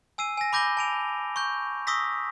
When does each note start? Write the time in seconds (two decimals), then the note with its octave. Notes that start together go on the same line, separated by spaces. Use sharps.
0.18 G#5 E6 C7 D#7
0.37 G#5 A#6
0.53 B5 D6 G6 A#6 D#7 G7
0.77 A5 D7 F7
1.36 C#6 G6
1.87 C#6 D#6 E6 A#6 B6